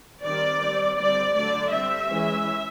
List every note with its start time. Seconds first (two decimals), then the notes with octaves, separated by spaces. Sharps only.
0.23 D#3 G3 C4 D5
0.60 G3 C4
0.96 D3 G3 C4 D5
1.34 D3 F#3 A3 D5
1.70 G3 C4 E5
2.08 E3 G#3 C#4